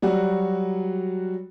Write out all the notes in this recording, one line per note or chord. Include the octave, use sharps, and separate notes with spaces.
F#3 G3 F#4